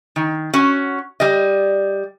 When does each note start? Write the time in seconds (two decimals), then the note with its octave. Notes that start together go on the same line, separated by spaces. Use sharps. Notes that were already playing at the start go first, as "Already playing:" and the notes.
0.16 D#3
0.54 C#4 F#4
1.20 G3 D5 D#5